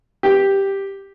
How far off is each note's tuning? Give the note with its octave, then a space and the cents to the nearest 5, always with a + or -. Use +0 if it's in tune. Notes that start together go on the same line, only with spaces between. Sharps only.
G4 +0